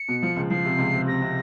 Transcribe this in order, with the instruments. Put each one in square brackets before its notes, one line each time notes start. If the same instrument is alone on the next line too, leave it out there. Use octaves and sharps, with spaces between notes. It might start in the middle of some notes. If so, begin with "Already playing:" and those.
Already playing: [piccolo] C#7
[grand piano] B2
F3
C#2
[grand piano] F3 [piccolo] C7
[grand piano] C3
C#2
C3
[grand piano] C3 [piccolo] A#6
[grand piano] C3